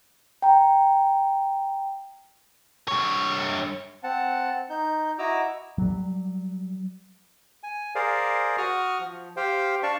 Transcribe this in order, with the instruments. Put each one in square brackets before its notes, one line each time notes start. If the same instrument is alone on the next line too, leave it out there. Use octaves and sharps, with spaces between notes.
[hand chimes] G5 A#5
[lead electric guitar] G2 C#5
[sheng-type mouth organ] C4 F#5 A5
D#4 G6
E4 F#4 D#5 A#5 D6 E6
[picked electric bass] F#3 G3
[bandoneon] G#5
G#4 A#4 C5 D5 F5
F#4 C#6 D#6 F6
F3
G4 C5 F5 G5
D4 D5 F5 A5 C#6